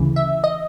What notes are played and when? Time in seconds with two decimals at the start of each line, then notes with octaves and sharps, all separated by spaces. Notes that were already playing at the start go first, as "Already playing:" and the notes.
Already playing: D2 C#3 E3
0.16 E5
0.44 D#5